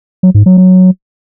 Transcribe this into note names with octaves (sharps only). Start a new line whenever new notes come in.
F#3
G#2
F#3
F#3